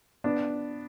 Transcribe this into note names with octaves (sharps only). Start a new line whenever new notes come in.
B3 D4